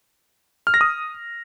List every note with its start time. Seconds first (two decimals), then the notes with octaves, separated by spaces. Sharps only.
0.67 F6
0.74 A#6
0.81 D#6